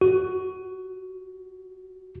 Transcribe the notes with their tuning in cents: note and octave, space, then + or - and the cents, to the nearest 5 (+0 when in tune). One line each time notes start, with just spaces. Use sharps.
F#4 +15